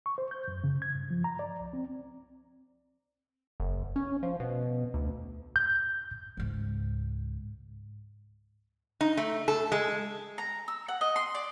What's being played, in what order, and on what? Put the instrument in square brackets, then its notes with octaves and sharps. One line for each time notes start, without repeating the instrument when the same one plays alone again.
[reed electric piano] C#6
C5
G6
F#2
C#3
G#6
G2
F3
A#5
D5
C2
C4
[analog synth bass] F#1
C#4
F3
B2
D2
[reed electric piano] G6
[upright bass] C#2 G#2
[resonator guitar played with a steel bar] D#4
A3
A4
G#3
[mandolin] A#5
E6
F#5
D#5
C6
D5